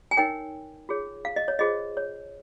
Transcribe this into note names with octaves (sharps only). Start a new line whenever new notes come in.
G#5
D#4 A#4 C#5 G5
F4 G#4 C#5
F5
D#5
C#5
F4 G#4 C5 D#5
C#5